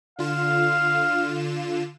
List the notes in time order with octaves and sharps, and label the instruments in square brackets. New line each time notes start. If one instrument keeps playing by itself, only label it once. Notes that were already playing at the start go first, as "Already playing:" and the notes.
[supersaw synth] D3 F4 E7 [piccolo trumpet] F5